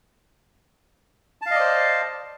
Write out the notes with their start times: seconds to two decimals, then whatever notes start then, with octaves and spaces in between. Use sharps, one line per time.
1.42 A5
1.46 F5
1.51 D#5
1.55 D5
1.60 C5